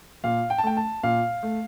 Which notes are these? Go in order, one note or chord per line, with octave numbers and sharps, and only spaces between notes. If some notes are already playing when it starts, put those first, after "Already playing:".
A#2 F5
G5
A5
A3 G5
A5
A#2 F5
A3